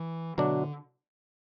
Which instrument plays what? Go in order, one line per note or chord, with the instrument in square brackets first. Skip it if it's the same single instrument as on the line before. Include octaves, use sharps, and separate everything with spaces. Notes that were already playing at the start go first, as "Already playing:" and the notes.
Already playing: [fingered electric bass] E3
[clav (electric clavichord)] B2 F#3 A3 D4 [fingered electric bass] D3